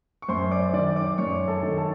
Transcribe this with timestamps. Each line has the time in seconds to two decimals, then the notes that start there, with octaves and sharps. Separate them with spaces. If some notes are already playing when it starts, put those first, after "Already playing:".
0.22 C#6
0.29 F#2 C5 C6
0.51 D5 D6
0.73 D#3 D5 D6
0.96 D5 D6
1.18 F#2 C#5 C#6
1.48 A4 A5
1.63 D#3
1.78 A4 A5